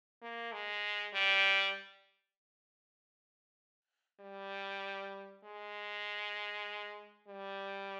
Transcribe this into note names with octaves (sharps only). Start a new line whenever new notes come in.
A#3
G#3
G3
G3
G#3
G3